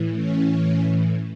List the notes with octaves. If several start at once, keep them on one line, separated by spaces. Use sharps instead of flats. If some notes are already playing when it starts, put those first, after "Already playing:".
Already playing: A2 E3
C#4